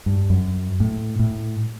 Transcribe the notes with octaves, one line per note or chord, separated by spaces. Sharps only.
G2
F#2
A2
A2